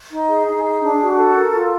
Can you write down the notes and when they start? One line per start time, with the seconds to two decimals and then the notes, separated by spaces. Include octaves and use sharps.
0.11 D#4
0.29 G#4
0.46 D#4
0.64 G#4
0.82 D4
1.00 F#4
1.18 A4
1.36 A#4
1.53 F4